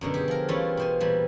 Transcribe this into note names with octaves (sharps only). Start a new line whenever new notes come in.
F#2 B2 D3
G4 G#4
F3 A#4
E3 G3 A3 C#4 E4 F4
B2 C5 G#5
A#2 E3 G3